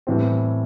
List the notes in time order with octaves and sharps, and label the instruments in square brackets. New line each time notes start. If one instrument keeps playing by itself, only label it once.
[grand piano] A2 E3 G3 C4